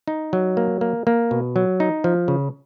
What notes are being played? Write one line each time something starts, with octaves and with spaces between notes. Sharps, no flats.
D#4
F#3
A#3
A#3
A#3
B2
F#3
D#4
F3
C#3